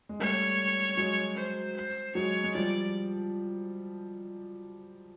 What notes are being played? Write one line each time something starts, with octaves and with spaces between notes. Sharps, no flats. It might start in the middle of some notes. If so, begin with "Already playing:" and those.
G#3
G3 A3 C#5
F#3 G#3
C5
C5
F#3 G#3 C#5
G#3
F3 G3 D5